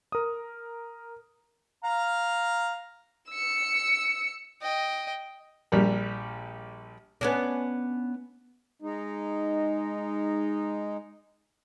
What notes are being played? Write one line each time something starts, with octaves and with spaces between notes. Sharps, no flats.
A#4 D#6
F5 A#5
E6 C#7
D#5 G5
A#1 G3 A#4
B3 C#4 D4
G#3 D#4